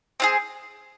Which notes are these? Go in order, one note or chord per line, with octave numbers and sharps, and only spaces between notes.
C4 F4 G#4